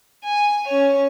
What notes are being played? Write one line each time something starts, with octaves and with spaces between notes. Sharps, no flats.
G#5
C#4 C#5